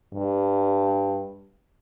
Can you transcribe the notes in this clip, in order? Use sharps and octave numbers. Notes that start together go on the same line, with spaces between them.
G2